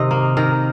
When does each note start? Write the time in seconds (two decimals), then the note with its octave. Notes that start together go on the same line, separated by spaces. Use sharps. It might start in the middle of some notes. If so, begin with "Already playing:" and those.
Already playing: C3 D#3 D#5
0.11 A#3
0.37 D#3 A#4